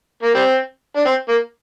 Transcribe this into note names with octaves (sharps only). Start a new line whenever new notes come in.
A#3
G3 C4
D4
C4
A#3